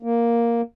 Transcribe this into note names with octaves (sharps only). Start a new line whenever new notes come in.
A#3